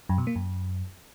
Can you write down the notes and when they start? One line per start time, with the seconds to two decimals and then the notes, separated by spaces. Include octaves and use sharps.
0.09 F#2
0.18 B2
0.27 A#3
0.36 F#2